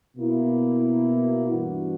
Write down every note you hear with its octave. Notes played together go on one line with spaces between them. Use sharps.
B2 A#3 E4
G2 E3 B3 D4 F#4